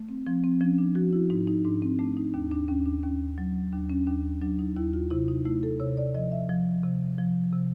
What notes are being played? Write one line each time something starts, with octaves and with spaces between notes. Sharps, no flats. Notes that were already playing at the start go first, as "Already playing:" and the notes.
Already playing: A3
C4
F3 C4
C4
F3 C#4
D4
F3 F#4
E4
G#2 D#4
D#4
G#2 D4
C4
A3 D4
D#4
D#2 D4
D4
D#2 C#4
D4
D#2 C#4
F#3
D#2 D4
C#4
D#2 D4
F#3 D4
D#4
D#2 E4
F4
C3 E4
D#4
A3 E4
A4
C3 C#5
D5
F3 D#5
E5
F3
C3
F3
C3